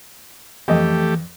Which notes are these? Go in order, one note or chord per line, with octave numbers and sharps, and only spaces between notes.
F2 E3 A3 G4 D#5